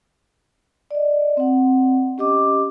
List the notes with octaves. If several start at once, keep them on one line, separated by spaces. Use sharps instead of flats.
D5 D#5
C4 F#5
C#4 G4 D#5 D6